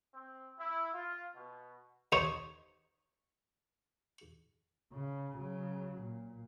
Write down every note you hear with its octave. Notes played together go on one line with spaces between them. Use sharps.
C4
E4
F4
B2
D#2 D#4 C5 C#5
C#3
C#3 F#3
A#2